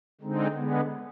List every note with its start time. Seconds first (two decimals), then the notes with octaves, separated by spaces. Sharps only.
0.21 D3 G#3 C4 D#4
0.54 D3 G#3 B3